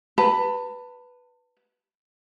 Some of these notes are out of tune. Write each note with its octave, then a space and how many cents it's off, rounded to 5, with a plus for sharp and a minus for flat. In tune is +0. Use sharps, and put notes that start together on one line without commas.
B4 +0 A5 +35